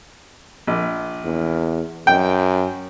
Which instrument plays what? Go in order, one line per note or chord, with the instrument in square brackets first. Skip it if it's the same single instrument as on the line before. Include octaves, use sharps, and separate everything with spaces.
[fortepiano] A#1
[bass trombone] E2
[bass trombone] F#2 [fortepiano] G5